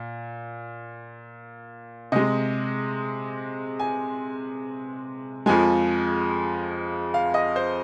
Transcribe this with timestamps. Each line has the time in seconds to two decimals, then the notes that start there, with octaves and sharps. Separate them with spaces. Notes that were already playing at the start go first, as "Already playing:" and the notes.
Already playing: A#2
2.12 C3 G#3 D#5
3.80 G#5
5.46 F2 F3 G#3 G#5
7.14 F5
7.34 D#5
7.56 C5